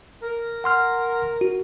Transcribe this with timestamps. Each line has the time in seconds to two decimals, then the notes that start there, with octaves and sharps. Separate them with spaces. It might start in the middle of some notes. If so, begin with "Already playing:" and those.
0.22 A#4
0.64 F#5 C6 F6
1.41 F#4